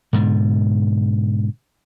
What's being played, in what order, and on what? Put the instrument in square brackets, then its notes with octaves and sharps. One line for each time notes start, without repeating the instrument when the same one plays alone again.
[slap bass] G#2 B2 D3